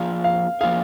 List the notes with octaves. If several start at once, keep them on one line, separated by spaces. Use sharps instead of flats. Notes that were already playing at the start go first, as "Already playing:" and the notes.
Already playing: F3 A#3 F4 G#4 F5
F5
F3 A#3 F4 G#4 F5